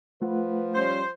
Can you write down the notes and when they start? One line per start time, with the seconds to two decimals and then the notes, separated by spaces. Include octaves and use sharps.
0.22 F3 A3 F4 B4 F#5
0.75 G3 C#4 C5